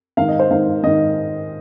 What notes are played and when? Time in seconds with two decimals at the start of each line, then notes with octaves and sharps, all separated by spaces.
0.17 G#2 D#3 F5
0.28 D#5
0.39 C5
0.50 G#2 D#3 F5
0.83 G#2 D#3 D#5